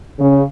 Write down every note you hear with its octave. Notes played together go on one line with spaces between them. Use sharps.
C#3